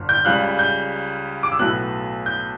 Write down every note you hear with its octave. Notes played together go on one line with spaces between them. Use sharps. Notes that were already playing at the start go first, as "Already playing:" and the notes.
Already playing: G1 G2
G6
C#2 C#3 G3 F#6
G6
D6
E6
B1 A2 F#3 B3 F#6
G6